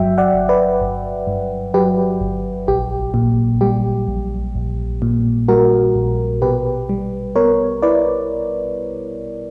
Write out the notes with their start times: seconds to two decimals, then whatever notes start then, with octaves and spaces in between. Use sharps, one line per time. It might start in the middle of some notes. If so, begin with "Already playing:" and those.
Already playing: G1 G2 F#3 E5 G5
0.18 D5 F#5
0.34 G1
0.49 B4 D5
0.80 G1
1.27 G2
1.74 F#3 G4 B4
2.20 G1
2.68 A#1 G4
3.14 A#2
3.61 G3 G4
4.08 A#1
4.55 A#1
5.02 A#2
5.48 G3 F#4 A#4
5.95 A#1
6.42 B2 G4 B4
6.89 G3
7.36 B3 A#4 C#5
7.82 E4 B4 D5